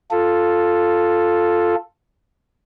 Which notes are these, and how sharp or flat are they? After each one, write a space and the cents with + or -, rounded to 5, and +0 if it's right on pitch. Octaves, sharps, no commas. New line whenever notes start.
F4 +0 A4 +0